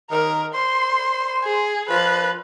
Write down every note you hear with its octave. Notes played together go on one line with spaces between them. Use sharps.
D#3 A#4
C5 C6
G#4
F3 B4